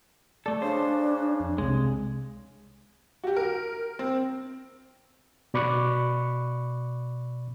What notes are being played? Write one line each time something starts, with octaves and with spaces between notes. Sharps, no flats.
A3 A4 D5
C#3 D4 C5
F2
C2 C3 G#3
F#4 G4
A#4
C4
B2 D5 B5 C#6 D6 F#6